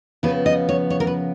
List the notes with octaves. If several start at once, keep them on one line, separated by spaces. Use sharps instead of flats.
C#3 F3 B3 B4
D#5
C#5
C#5
A#4
B4